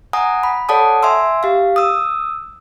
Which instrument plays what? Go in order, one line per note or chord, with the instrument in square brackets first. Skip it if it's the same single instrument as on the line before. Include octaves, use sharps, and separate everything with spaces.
[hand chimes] F#5 G#5 A#5 D#6
B5
A4 C#5 D5 F#5 A5 D#6
E5 G#5 C6 E6
G4 F5
D#6 E6